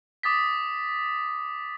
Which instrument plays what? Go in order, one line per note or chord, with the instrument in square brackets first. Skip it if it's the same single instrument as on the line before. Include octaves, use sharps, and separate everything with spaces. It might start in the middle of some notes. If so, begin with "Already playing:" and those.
[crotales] D6 D#6 A6 B6